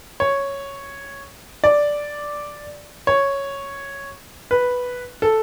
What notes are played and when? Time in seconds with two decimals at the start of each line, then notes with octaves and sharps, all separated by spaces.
0.20 C#5
1.64 D5
3.07 C#5
4.51 B4
5.22 A4